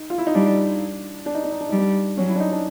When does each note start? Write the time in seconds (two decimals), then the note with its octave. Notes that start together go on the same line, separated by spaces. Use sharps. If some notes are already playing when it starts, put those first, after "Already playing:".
Already playing: D#4
0.10 F4
0.18 E4
0.27 D#4
0.35 G3 D4
1.26 D4
1.35 D#4
1.44 D4
1.52 D#4
1.61 D4
1.69 G3 D#4
1.78 D4
2.17 F#3 C#4
2.29 E4
2.36 D4
2.40 D#4
2.52 D4